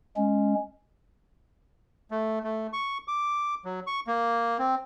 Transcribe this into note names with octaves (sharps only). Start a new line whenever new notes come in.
G#3 C#4
A3
A3
C#6
D6
F#3
C#6
A#3
C4